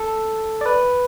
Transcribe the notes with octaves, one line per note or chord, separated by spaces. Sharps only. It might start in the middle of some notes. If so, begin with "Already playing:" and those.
Already playing: A4
D5
B4